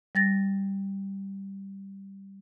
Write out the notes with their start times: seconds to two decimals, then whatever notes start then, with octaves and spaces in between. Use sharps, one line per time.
0.15 G3 A6 A#6